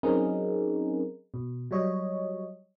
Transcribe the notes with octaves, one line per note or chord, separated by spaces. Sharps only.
F#3 C4 C#4 D#4 G#4 A#4
B2
F#3 G3 C#5 D#5